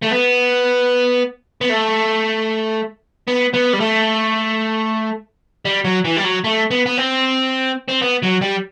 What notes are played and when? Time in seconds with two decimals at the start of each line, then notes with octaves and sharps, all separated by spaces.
0.03 A3
0.11 B3
1.61 B3
1.70 A3
3.27 B3
3.54 B3
3.73 G3
3.80 A3
5.65 G3
5.85 F#3
6.05 E3
6.17 G3
6.24 F#3
6.44 A3
6.71 B3
6.86 B3
6.97 C4
7.89 C4
8.02 B3
8.23 F#3
8.42 G3